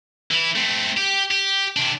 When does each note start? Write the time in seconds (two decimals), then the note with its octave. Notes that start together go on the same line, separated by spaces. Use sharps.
0.31 E3 E4
0.55 A3 C4
0.97 G4
1.31 G4
1.76 C3 D4